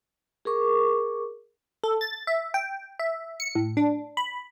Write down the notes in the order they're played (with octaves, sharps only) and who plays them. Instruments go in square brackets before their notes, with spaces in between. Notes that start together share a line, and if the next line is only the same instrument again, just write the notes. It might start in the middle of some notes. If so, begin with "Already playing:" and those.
[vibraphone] G#4 A#4 C#6 D6
[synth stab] A4
A6
E5
G5
E5
C#7
A2
D4
B5